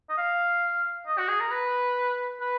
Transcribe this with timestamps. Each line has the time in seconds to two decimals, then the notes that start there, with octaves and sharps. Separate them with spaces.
0.09 D#5
0.17 F5
1.06 D#5
1.18 F#4
1.28 G#4
1.40 A#4
1.51 B4
2.40 B4